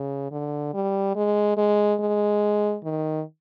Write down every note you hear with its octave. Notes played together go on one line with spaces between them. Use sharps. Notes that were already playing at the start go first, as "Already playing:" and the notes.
Already playing: C#3
D3
G3
G#3
G#3
G#3
D#3